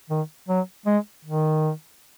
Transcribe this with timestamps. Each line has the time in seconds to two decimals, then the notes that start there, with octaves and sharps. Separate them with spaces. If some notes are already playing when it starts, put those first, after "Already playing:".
0.10 D#3
0.49 F#3
0.86 G#3
1.25 D#3